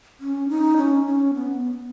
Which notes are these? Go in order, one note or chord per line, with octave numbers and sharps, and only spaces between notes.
C#4
D#4
C#4
C#4
B3
B3